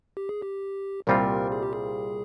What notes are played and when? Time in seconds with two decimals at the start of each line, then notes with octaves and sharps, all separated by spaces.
0.17 G4
0.29 G#4
0.42 G4
1.07 C2 A#2 G3 C4 F4 A#4
1.52 G#4
1.63 G4
1.73 G#4